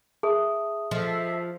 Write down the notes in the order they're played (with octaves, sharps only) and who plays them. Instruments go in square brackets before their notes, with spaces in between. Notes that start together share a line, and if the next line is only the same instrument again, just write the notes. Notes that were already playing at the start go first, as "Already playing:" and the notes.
[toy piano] G#4 [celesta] E5 A5 D#6
[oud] F3 [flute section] A4 E5 [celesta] D#5